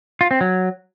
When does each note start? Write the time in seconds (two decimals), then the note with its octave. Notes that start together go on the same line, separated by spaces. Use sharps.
0.21 F4
0.31 C4
0.41 F#3